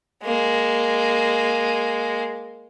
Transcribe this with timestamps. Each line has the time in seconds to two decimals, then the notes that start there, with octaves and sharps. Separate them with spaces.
0.24 G#3 A#3